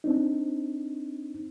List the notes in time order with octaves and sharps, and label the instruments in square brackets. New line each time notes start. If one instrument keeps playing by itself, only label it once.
[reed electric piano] C4 D4 D#4